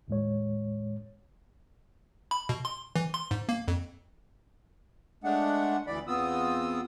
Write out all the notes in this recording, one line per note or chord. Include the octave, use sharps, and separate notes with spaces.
D#2 A2 G#3 C#5
B5
B2
C6
E3
C6
G#2
A#3
F2
G#3 A3 D4 F#5
D2 E3 D5 B5
E2 B3 C4 F4 D#6 E6